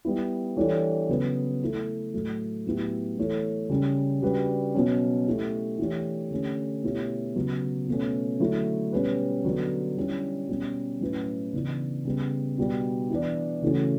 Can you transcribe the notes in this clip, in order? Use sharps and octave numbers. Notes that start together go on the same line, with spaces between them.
G3 B3 E4
E3 G3 D4 A4 C#5
C#3 F#3 B3
A3 E4 A4
A2 F#3 A3
A2 F#3 B3 E4 G4
E3 A3 E4 A4 C#5
C#3 G3 C#4
C#3 G3 D4 F#4 B4
B2 F#3 C#4
A3 E4 G4
E3 A3 D4 G4 C#5
D3 A3 C#4 G4
B2 A3 E4 G4 C#5
C#3 F#3 B3
B2 A3 C#4
D3 F#3 A3 E4
B2 G3 C#4 G4 B4
D3 F#3 B3 F#4 B4
D3 G3 C#4 E4
B2 G3 C#4
A2 F#3 C#4 E4 B4
C#3 E3 B3 D4
C#3 G3 B3
B2 G3 D4 F#4
E3 B3 D4
C#3 E3 A3 C#4 F#4